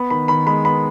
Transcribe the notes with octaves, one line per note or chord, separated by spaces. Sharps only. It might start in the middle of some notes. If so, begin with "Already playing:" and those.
Already playing: B3 B5
D#3 B5
D#3 B5
G#3 B5
B3 B5